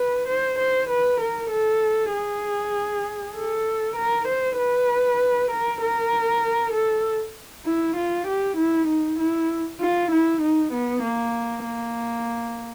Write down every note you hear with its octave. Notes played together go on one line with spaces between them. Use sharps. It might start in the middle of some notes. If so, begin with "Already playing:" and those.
Already playing: B4
C5
C5
B4
A#4
A4
G#4
A4
A#4
C5
B4
A#4
A#4
A4
E4
F4
G4
E4
D#4
E4
F4
E4
D#4
B3
A#3
A#3